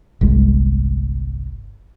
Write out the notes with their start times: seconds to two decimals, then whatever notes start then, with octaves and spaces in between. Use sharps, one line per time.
0.21 G1 C2 G#3